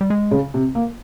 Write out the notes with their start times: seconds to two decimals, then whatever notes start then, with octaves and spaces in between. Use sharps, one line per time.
0.01 G3
0.10 G#3
0.31 C#3
0.54 C3
0.75 A#3